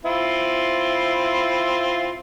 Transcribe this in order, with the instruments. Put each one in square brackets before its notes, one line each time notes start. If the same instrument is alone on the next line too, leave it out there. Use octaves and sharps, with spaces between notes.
[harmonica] C4 E4 F4